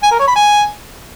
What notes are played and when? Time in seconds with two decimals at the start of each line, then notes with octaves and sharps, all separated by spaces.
0.03 G#5
0.11 A#4
0.19 C#5
0.27 B5
0.36 G#5